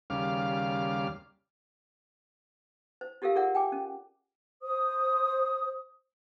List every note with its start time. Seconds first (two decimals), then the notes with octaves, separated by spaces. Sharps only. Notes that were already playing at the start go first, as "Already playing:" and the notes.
0.10 D#2 C#3 G3 F5 D6 F6
3.01 C5
3.22 F4 G4 A4 A#4 F5
3.35 F4 G#4 A#4 D5 F#5
3.55 G5 G#5 D6
3.72 C#4
4.62 C5 D#6